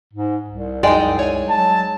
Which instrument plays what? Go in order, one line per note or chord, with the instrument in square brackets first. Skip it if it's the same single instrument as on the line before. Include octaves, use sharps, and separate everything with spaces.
[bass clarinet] G#2
C2
[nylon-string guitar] F#2 D5 G5 [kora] G#3 D#4
[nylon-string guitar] C#5 G#5
[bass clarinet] F#3 [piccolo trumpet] A5